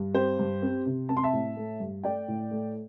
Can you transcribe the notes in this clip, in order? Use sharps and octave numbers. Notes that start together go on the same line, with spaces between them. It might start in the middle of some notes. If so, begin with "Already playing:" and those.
Already playing: G2
C4 G4 C5
G2
C4
C3
C4 A5
C6
E5 A5
A2
A3
G2
A3 D5 G5
A2
A3